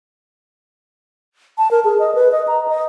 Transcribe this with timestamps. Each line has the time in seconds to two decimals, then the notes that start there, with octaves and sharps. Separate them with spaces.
1.58 A5
1.71 A#4
1.85 G#4
1.99 D#5
2.15 B4
2.32 D#5
2.48 A#5
2.68 D#5